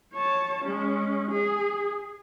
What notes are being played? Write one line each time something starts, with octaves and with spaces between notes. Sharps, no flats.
C#5 A5
G#3 C#4
G#4